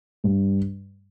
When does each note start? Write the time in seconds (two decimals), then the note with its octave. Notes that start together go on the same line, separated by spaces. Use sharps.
0.24 G2